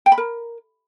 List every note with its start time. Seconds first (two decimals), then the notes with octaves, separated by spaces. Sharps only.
0.06 G5
0.12 B5
0.18 A#4